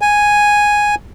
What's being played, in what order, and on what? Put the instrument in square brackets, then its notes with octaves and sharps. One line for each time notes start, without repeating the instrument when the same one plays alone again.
[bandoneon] G#5